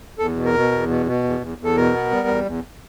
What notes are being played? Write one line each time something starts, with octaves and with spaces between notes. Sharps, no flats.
E2 A4
B2
A#4
B2
E2
B2
B2
E2
E2
E2
A4
B2 A#4
B3
G3
E2
E2